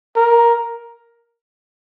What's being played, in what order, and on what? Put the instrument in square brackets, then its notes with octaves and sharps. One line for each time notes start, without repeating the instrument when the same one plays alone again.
[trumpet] A#4